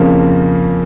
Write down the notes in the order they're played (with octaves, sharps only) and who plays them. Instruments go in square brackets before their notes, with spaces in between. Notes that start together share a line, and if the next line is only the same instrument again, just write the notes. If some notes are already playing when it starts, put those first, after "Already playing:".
Already playing: [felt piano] F2 C#3 F3 A#3